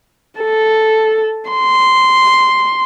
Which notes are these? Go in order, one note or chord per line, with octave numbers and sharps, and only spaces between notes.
A4
C6